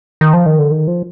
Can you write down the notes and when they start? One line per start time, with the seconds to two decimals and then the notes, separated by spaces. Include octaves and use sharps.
0.21 D#3
0.33 F3
0.46 D#3
0.59 D3
0.71 D#3
0.87 F3